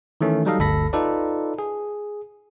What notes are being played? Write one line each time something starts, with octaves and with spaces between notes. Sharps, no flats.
D#3 E3 A3 C#4
F#3 G3 D#4 A4 D#5 F5
G1 D2 A4 B5 A#6
D#4 F4 A4 B4 D5
G#4